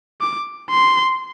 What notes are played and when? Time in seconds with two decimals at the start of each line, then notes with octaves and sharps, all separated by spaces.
0.21 D6
0.70 C6